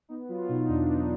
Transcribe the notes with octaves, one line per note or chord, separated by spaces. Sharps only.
B3 D#4
F#3 F4
B2 D#4
E2 D4
B3 D#4